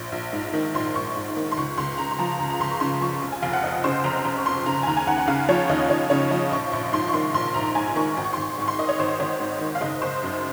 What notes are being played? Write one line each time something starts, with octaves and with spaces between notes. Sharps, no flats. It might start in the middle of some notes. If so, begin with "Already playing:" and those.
Already playing: A#1
A#1
G#2
D#3
A#1 C6
A#1 C#6
G#2
D#3
C6
C#2 C#6
C#2 C6
C#3 A#5
C6
F3 A#5
C#2 A#5
A#5
C#2 C6
C#6
C#3 C6
F3 C#6
F1
G#5
F1 F5
F#5
F2 D#5
C#3 C5
F1 A#5
F1
C#6
F2 C6
C#3 A#5
G#5
D#2 A#5
G#5
D#2 F#5
F#5
C#3 F5
F3 C#5
D#2 D#5
D#2 C#5
C#3 C#5
F3 D#5
A#1 C#6
A#1 C#6
G#2 C6
C#6
D#3 C6
A#1 C6
A#1 A#5
G#2 G#5
D#3 C#6
G#1
C#6
C6
G#1 C#6
G#2 C#6
C6
D#3 D#5
C#5
G#1 C5
G#1 C#5
G#2
D#3
F5
F#1 D#5
F#1 C5
F#2